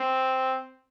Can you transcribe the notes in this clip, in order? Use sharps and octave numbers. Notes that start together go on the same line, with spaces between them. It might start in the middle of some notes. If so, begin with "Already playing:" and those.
Already playing: C4